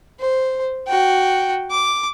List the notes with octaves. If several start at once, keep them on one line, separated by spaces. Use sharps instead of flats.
C5
F#4 G5
D6